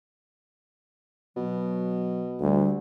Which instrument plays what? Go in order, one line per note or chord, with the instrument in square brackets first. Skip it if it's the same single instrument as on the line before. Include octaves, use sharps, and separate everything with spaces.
[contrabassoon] B2 [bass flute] F#3
[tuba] D2 [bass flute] G3